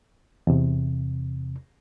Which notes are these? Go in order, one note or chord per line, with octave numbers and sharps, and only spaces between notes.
E2 C3